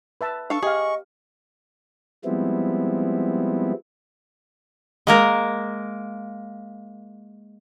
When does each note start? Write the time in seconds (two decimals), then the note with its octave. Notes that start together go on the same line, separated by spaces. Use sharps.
0.21 B4 E5 A5
0.50 D4 A4 F5 C#6
0.63 G4 G#4 D#5 F5
2.25 F3 G3 G#3 B3 C4 E4
5.07 G#3 A#3 A#4